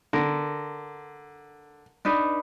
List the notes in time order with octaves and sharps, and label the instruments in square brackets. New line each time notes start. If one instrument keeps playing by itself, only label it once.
[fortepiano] D3 [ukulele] A#4
[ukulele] D4 D#4 B4